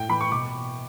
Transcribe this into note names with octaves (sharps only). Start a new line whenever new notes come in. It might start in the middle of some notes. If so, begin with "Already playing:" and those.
Already playing: A2 G5
E3 B5
C#6
B2 D6